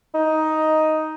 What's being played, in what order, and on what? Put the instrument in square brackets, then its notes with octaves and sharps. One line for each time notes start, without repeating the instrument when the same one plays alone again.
[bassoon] D#4